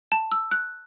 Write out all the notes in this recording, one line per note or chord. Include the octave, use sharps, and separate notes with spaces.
A5
E6
F#6